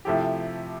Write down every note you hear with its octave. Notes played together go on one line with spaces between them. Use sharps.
C3 F3 A3 E4 G4